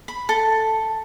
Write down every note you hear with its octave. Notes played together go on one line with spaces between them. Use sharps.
B5
A4